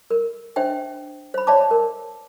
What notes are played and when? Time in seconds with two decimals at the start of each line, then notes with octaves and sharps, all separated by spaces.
0.10 A#4
0.56 D4 C5 E5 G5
1.34 C5 B5
1.47 C#5 D5 E5 A5 D6
1.71 A#4